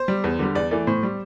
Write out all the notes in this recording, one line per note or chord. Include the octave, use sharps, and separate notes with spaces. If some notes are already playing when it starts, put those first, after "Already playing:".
Already playing: C5
G3
E2
D3 G3
E2 D5
E3 A3 D5
A2 C5
G3